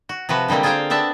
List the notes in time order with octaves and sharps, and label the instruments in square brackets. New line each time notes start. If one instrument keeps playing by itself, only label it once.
[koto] F#4
C3 F3 F#4 B4
D3 G3 G#3 A#3 C4
F4 G#4 A#4 C5 F5 G5
B3 C4 D4 E5 A5